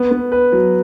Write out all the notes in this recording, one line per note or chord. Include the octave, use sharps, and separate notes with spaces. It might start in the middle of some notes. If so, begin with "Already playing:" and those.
Already playing: B3
B3
B4
F#3